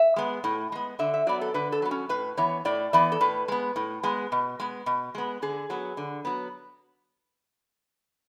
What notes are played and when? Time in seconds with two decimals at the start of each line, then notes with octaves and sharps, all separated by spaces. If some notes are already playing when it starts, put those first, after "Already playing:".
Already playing: E5
0.16 G#3 B3
0.44 A2
0.72 G#3 B3
0.99 D3 E5
1.14 E5
1.27 F#3 B3 D5
1.41 A4
1.54 D3 B4
1.72 A4
1.82 F#3 B3
1.91 C#4
2.09 A2 B4
2.37 E3 B3 C#5
2.65 A2 D5
2.93 E3 B3 D5
3.12 A4
3.21 A2 B4
3.48 G#3 B3
3.76 A2
4.03 G#3 B3
4.32 B2
4.60 G#3 B3
4.86 B2
5.15 G#3 B3
5.42 D3 G#4
5.70 F#3 B3
5.97 D3
6.25 F#3 B3